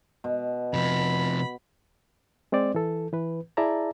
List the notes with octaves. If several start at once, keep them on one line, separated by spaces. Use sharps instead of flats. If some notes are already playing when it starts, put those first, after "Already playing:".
B2
C3 F3 B5
G#3 C4 C5 D5
E3 A4
E3 B4
E4 G#4 D5 E5 A5 A#5